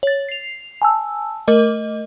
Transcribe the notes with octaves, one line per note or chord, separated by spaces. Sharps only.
C#5 A6
C7 F7
G#5 A5 E6
A3 A#4 D#5